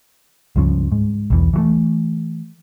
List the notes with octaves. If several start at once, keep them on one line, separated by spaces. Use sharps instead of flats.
C#2 G2 F3 C#4
G#2
B1 E2 E3
E3 F#3 A3